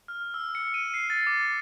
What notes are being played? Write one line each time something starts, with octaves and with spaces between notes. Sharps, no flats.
F6
E6
C#7
D#7
C7
A6
D6